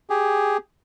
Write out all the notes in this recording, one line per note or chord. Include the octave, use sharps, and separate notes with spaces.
G4 G#4